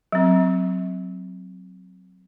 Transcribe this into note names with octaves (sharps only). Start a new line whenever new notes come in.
F#3 C4